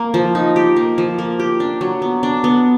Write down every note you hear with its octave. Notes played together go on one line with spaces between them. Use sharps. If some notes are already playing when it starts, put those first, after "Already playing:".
Already playing: A#3
F3
D#4
G4
A#3
F3
A#3
G4
D4
F#3
B3
D4
B3